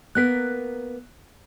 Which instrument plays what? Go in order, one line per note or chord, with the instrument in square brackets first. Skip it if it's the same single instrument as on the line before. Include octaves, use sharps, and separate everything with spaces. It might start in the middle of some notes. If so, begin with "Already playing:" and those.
[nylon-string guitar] A#3 B3 A#4 [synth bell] F#6 B6